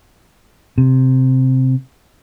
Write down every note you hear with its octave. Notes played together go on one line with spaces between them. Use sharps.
C3